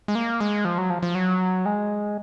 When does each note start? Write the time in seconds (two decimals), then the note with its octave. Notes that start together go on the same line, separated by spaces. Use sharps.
0.08 G#3
0.15 A#3
0.40 G#3
0.65 F3
0.78 F#3
0.90 F3
1.03 F3
1.15 F#3
1.65 G#3